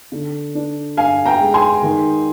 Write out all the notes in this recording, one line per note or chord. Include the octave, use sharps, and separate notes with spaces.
D3
D4
G2 F5 G#5
G5 A#5
G#3
G#5 C6
D#3